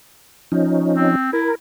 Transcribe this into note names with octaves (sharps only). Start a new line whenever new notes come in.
F3 C#4 D#4
C4
E4 A#4